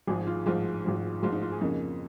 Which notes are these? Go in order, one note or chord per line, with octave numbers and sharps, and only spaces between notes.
G#1 G#2 F3 G#4
F4
G#1 G#2 F3 F4
G#1 G#2 F3
G#1 G#2 F3 F4
D#4
F4
G#4
F2 C#3 A#3 C#4 D#4